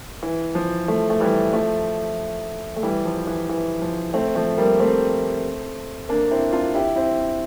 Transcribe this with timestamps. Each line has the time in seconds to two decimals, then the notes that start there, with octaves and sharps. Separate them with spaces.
0.23 E3
0.55 F3
0.88 F3 A3
1.10 A3
1.20 E3 G3
1.53 F3 A3
2.76 A3
2.83 E3 G3
3.05 F3
3.27 E3
3.49 E3
3.82 F3
4.13 A3 C4
4.35 F3 A3
4.58 G3 A#3
4.79 A3 C4
6.09 A#3 D4
6.31 C4 E4
6.52 D4 F4
6.75 E4 G4
6.96 C4 E4